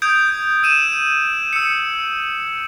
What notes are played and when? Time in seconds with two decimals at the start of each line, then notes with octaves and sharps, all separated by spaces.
0.02 D#6 G6 G#6 D7
0.63 E6 D#7 E7
1.53 E6 C#7